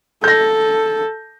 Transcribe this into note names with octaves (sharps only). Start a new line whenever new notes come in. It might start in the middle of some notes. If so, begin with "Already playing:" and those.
A4 G6 A#6